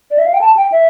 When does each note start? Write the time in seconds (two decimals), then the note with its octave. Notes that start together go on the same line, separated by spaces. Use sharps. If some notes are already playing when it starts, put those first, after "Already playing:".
0.11 D5
0.18 E5
0.26 F5
0.34 G5
0.41 A5
0.57 G5
0.72 E5